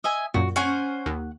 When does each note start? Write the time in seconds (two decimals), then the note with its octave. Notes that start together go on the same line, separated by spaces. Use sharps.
0.04 D#5 E5 G#5
0.34 F#2 A#2 F#4
0.56 C#4 C5 F#5 G#5 C#6
1.06 D#2